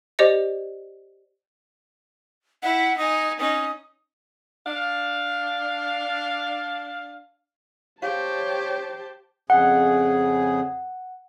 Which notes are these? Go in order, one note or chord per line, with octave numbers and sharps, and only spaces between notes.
G4 C5 D5 D#5 C#7
E4 E5 F#5
D#4 G#5 D#6
C#4 D#4 D#6
D4 F5
G4 C5 C#5 F5 A5
F2 C#3 G#4 F#5